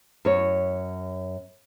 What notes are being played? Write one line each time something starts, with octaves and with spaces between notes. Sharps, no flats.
F#2 C#5